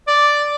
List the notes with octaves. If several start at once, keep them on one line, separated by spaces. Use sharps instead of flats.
D5